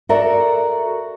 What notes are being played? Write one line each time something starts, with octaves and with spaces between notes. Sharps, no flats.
F#4 A4 A#4 D5 E5